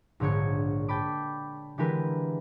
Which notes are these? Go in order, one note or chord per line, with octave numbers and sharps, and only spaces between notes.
A#1 G#2 D3 C#5 G#6 C#7
G5 A5 B5 D6
D3 E3 G#3 G4 A#4 B4